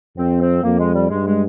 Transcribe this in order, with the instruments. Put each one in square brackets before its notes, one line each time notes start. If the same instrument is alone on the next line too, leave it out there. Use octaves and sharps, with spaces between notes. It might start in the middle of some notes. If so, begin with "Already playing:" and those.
[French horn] F2 [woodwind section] C4
[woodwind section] C4
[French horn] F2 [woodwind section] A#3
[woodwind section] G#3
G3
[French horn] G2 [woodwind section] G#3
[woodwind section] G#3